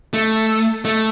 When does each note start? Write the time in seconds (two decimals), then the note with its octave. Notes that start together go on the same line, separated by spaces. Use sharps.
0.14 A3
0.85 A3